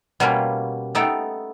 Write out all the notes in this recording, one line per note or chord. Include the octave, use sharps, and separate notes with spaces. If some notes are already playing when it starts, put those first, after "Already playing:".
B2 G3 A#3 C#4 F4
A3 B3 D#4 A4 G5